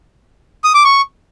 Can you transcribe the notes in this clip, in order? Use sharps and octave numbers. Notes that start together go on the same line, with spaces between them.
D#6
D6
C#6